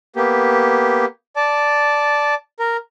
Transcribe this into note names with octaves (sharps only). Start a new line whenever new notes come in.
A#3 B3 G4
D5 A5
A#4